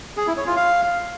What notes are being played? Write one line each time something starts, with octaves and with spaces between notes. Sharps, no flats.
G#4
E4
C#5
F4
F5